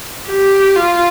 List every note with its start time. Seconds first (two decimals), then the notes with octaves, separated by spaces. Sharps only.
0.28 G4
0.76 F4